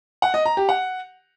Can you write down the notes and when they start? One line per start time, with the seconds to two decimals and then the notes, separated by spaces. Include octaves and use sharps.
0.22 F#5
0.34 D#5
0.45 A#5
0.57 G4
0.69 F#5